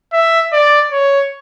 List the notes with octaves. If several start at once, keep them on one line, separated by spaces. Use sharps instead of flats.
E5
D5
C#5